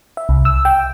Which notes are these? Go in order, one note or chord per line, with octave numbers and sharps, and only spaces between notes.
E5
C2
E6
G5